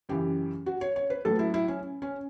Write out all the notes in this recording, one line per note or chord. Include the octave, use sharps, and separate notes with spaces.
F#2 C#3 E3 G4
F#4
C#5
C#5
B4
A2 F#3 A4
E4
E4
C#4
C#4